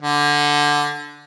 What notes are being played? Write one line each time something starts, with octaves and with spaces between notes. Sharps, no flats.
D3